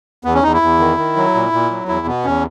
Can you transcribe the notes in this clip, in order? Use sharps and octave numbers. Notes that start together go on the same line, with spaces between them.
E2 B3
C#4
E2 D#4
E4
E2
D#3
D#3
F#3
A#2
A#2
F#3
E2 E4
B2 B3
E2 C#4